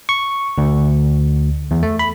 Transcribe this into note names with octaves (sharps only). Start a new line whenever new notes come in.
C#6
D2
E2
A3
B5